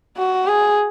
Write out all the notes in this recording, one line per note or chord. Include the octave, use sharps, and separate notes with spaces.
F#4
G#4